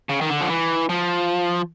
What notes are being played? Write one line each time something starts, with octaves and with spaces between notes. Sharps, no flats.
C#3
D#3
D3
F3
E3
F3